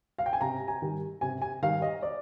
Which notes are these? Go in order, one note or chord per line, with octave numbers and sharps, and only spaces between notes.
F5
G5
G#5
C3 A#5
G#5
D#3 G3
C3 G#5
G#5
D#3 G3 F5
D#5
D5